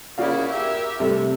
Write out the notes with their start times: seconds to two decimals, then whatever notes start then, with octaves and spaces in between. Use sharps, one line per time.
0.18 C#3 A#3 E4 F#4 D5 F5
0.50 G4 A#4 E5
1.00 C3 G3 A3